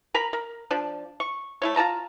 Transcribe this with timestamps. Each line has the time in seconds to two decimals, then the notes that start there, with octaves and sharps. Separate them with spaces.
0.14 A#4 A#5 B5
0.33 A#4
0.71 F3 D4
1.20 C#6
1.62 A3 E4 C#5
1.76 F4 A#4 A5 A#5